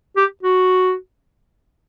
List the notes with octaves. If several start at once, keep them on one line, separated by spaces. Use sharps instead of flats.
G4
F#4